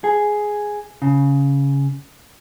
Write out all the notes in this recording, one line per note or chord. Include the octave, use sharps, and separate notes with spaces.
G#4
C#3